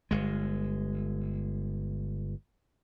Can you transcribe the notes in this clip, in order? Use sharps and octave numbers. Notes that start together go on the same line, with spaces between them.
G1 G#3